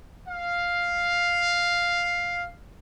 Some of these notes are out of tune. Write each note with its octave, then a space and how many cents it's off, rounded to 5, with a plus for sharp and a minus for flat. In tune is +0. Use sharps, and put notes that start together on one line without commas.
F5 +0